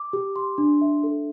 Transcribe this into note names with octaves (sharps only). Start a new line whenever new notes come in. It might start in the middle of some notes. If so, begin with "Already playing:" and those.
Already playing: D6
G4
C6
D4
E5
A4